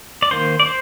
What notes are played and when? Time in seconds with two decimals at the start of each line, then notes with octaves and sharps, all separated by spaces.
0.23 D5
0.31 D#3 A#3 C5
0.60 D5
0.66 C5